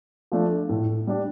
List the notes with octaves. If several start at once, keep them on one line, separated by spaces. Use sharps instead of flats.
F3 A3 D4
A2
G3 D4 G4